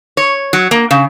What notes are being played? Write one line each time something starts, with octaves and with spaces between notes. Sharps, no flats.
C#5
F#3
A#3
C#3